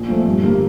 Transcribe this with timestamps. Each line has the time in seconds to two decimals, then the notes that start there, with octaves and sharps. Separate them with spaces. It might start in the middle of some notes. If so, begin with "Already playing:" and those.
Already playing: A#1
0.08 A#2 F3 A3
0.26 G2
0.43 D3 G3 A#3